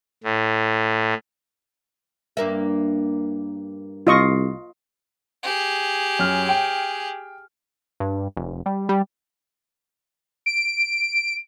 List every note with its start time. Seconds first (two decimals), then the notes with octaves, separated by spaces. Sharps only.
0.24 A2
2.37 G2 A#3 E5
4.07 C2 F4 D#5 C#6
5.44 G4 G#4
6.19 F#2 F6
6.49 G5
8.00 G2
8.37 F1
8.66 G3
8.89 G3
10.46 D7